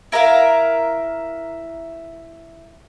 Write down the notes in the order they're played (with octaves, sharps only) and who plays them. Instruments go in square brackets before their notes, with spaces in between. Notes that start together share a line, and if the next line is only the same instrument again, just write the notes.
[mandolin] E4 A#4 E5 F5